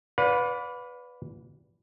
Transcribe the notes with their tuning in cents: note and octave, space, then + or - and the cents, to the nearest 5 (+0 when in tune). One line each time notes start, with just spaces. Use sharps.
B4 +0 D5 -25 F5 +45